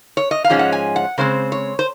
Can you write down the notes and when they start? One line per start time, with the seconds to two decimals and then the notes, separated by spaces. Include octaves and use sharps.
0.17 C#5
0.31 D#5
0.44 F5
0.50 G#2 F3 G#3 C#4
0.59 F#5
0.72 G#5
0.96 F#5
1.18 C#3 G#3 C4 C5
1.52 C#5
1.79 C5